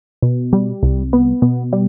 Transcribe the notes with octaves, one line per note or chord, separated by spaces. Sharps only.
B2
G3
C2
B3
B2
G3